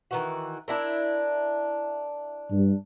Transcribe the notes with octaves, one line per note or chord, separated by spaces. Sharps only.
D#3 E3 F#4
D4 E4 A#4
G2